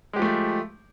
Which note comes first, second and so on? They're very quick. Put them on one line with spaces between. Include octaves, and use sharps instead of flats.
G#3 G4 F3 A3